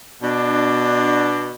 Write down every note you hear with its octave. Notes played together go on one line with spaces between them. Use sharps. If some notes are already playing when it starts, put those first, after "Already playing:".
B2 D4